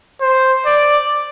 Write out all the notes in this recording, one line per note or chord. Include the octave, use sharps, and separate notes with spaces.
C5
D5